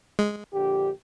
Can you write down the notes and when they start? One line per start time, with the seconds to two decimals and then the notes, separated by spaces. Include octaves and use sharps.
0.19 G#3
0.54 A#1 D3 G4